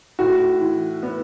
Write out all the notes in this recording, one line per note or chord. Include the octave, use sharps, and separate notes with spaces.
A2 F#4
E3
B3